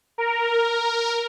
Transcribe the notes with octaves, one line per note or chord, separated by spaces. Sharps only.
A#4